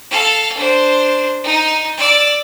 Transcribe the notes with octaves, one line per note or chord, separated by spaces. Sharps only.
A4 F5
D4 C5
D#4
D5 E6